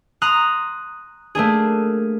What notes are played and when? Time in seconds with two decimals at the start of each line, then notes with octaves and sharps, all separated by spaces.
0.22 A#5 C6 D#6 F#6
1.35 A3 A#3 D4 G#4